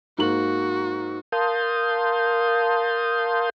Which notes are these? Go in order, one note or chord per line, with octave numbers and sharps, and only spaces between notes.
G#2 A#3 F#4 F#7
A#4 F5 A5 C6 D#6 G6